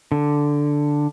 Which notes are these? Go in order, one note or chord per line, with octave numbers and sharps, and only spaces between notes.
D3